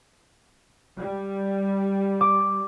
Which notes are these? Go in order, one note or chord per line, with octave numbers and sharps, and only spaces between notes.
G3
D6